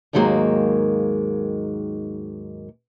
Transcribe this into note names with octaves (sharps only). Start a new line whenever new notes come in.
D#2 G#2 D#3 F#3 G#3 A#3